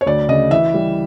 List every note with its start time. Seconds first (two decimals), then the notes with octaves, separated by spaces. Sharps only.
0.01 C#5
0.06 D2 D5
0.28 C#3 D#5
0.51 E3 E5
0.74 G3